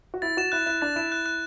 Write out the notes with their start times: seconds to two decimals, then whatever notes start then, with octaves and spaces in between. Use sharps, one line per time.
0.14 F#4
0.22 E4 A6
0.37 F#4 E7
0.52 E4 F#6
0.66 E4 F#6
0.81 D4 A6
0.96 E4 E7
1.12 F#6
1.26 F#6